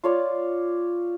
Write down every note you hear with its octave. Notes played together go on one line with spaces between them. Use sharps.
F4 C#5 D5